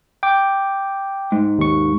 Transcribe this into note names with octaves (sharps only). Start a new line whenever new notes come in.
G5 D6
G#2
D#2 C#6